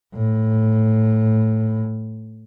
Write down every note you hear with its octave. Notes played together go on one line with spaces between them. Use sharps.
A2